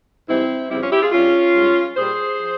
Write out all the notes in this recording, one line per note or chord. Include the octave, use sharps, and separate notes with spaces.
G#2 E3 G3 C4 E4
F2 C#3 G3 C4 E4
C#4 F4
E4 G4
F4 G#4
G2 G3 C#4 F4
G#2 G3
A#2 G3 G#4 C5
F3